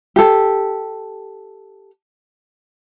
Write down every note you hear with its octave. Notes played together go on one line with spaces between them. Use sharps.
G4 A4